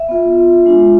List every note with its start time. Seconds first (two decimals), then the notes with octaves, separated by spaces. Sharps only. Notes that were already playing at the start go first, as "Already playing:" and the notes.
Already playing: E5
0.09 B3 F4
0.66 G#3 D4 F4